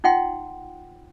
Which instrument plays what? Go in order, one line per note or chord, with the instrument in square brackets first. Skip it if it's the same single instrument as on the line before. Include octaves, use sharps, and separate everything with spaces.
[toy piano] D#4 F4 F#5 G5 C6